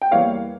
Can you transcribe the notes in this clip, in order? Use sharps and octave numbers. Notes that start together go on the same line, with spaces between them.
G5
E2 E3 G3 A#3 C#5 F5